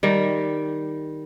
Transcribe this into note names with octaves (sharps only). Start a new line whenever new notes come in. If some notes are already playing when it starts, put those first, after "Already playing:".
D#3 G3